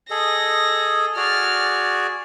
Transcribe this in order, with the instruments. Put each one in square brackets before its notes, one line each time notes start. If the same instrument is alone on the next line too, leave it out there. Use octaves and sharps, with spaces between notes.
[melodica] G#4 A4 D#5 [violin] A#6
[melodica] F#4 G#4 D5 [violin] F6 A6